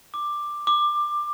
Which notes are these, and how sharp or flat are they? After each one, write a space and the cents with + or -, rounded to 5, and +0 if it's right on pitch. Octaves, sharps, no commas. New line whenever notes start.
D6 +10
D6 +20